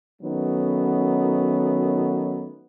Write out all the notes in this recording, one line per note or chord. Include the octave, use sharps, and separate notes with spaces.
D#3 F#3 A3 B3 C#4 D#4